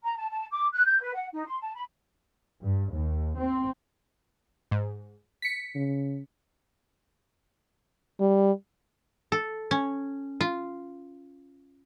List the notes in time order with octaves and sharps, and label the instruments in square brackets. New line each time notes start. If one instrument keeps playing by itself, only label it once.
[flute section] A#5
A5
A5
D6
F#6
G6
B4
F#5
D#4
C6
A5
B5
[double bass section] G2
D#2
C4
[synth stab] G#2
B6 C#7
[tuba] C#3
[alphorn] G3
[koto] A4
C#4
F4